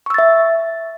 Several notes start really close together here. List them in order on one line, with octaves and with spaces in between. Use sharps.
C#6 E6 A6 E5